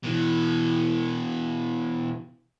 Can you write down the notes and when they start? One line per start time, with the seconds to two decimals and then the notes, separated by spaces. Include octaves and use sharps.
0.04 B2 E3